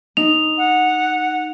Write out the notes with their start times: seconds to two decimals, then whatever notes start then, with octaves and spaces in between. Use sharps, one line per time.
0.17 D#4 F7
0.58 F#5